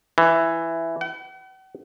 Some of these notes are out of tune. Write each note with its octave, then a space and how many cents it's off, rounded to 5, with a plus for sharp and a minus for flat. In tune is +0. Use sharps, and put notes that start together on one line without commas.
E3 +5
F#5 +45